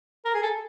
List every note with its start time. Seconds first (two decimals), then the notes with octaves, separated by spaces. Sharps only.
0.25 A#4
0.34 G#4
0.43 A4